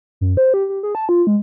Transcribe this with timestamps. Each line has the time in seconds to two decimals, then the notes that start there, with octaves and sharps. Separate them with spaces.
0.21 F#2
0.37 C5
0.54 G4
0.69 G4
0.83 G#4
0.95 A5
1.09 F4
1.27 G#3